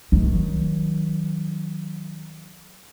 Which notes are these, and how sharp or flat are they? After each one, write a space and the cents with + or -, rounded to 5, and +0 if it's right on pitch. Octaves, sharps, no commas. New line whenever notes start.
D#3 +25 F#3 -5